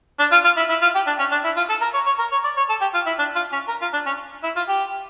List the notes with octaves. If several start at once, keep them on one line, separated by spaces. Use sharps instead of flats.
D4
F4
F4
E4
E4
F4
G4
D4
C#4
D4
E4
F4
A4
A#4
C#5
C#5
A#4
C#5
D5
C#5
A4
G4
F4
E4
D4
F4
C#4
A#4
F4
D4
C#4
E4
F4
G4